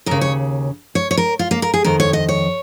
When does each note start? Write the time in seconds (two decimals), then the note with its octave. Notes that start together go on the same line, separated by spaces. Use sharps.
0.06 D#2 C#3 A#4
0.21 C#5
0.95 C#5
1.11 C#5
1.17 A#4
1.39 F4
1.51 A#3
1.62 A#4
1.74 G#4
1.84 F2 D#3 A#4
2.00 C#5
2.13 D#5
2.29 C#5